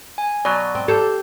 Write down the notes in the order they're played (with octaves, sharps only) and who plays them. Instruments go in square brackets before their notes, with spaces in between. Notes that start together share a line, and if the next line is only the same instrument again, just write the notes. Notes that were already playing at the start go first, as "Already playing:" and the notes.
[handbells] G#5
[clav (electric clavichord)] B2 F#3 [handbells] D5
[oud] C4
[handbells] G4 G6 [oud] A4